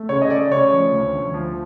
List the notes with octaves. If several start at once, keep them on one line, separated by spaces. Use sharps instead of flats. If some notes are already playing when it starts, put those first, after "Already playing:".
Already playing: A3
C#3 C#5
D#5
A3 D5
C#3 C#5
F3
D2
D2
F3